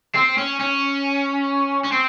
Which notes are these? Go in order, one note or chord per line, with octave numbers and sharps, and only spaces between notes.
C4
C#4
C#4
C#4
C4